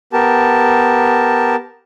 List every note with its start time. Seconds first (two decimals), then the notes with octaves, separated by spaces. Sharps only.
0.13 B3 G4 A#4 A5